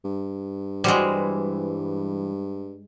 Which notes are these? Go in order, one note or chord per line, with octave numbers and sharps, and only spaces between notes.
G2
E3 G3 G#3 F#4 C5